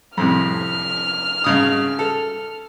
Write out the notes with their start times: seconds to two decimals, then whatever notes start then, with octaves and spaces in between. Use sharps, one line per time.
0.17 F2 A2 C3 F6
1.44 G#1 C#3 D#6
1.99 A4